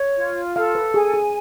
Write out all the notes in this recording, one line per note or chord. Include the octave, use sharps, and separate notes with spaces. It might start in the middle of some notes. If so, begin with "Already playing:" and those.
Already playing: C#5
F4
A4 F5
B4
G#4 G#5
G#4